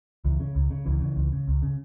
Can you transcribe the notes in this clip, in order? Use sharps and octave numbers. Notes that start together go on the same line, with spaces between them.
C#2 E3
C#3
C#2
C#3
C#2 E3
C#3
C#2
C#3
C#2
C#3